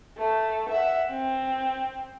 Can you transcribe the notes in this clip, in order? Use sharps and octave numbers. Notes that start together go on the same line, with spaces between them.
A3
E5 F#5
C4